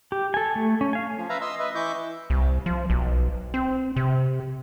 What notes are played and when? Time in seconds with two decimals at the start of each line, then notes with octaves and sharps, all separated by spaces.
0.12 G4
0.34 A4 G#5
0.55 A3
0.81 C#4
0.93 F5 G#5
1.18 F3
1.30 B4 E5 F5 A#5
1.41 D#5 C6 E6
1.59 B4 D#5 E5
1.75 E3 E4 C#6 D6 G6
2.30 C2
2.66 F3
2.90 B1
3.54 C4
3.96 C3